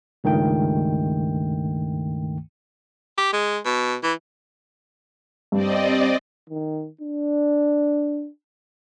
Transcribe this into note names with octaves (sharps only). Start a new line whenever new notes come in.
C#2 G2 D#3 A3 G5
G4
G#3
B2
E3
G2 C4 D5 D#5
D#3
D4